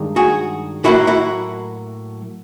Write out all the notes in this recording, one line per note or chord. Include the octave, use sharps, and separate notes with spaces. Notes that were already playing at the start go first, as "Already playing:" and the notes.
Already playing: G2 D#3 G#3
F#4 G#4
A2 F#3 A#3 E4 F#4
E4 F#4